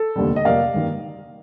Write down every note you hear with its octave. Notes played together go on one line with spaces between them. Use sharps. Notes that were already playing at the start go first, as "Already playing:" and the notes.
Already playing: A4
F1 D#2 D3 G3
D#5
F2 C3 G3 A#3 D5 F5
G2 D#3 A#3